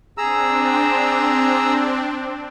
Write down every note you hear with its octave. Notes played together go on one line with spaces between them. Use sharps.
C4 D4 G#4 A#5 E6